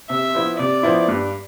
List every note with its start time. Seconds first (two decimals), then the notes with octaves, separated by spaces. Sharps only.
0.10 C3 E5
0.35 F3 B3 E4
0.59 C3 D5
0.83 F3 B3 E4
1.08 G2